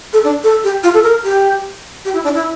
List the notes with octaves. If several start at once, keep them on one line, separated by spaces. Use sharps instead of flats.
A4
D4
A4
G4
F4
A4
A#4
G4
G4
E4
D4
E4